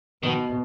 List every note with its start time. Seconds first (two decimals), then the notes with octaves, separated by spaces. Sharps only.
0.23 B2 D#3